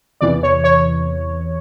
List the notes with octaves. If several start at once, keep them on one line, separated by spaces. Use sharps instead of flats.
E2 C3 E3 D5
C#5
C#5